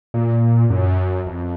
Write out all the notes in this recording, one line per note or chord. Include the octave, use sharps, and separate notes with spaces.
A#2
F#2
F2